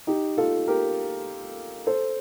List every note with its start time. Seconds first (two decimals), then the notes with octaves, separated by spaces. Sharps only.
0.07 D#4 G4
0.37 F4 A4
0.68 G4 A#4
1.87 A4 C5